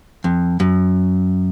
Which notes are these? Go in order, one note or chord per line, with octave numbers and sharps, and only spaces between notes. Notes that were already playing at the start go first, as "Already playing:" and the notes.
F2
F#2